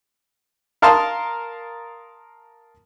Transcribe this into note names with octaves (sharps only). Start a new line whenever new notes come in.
A#4 F5 A5 C6 D#6 F6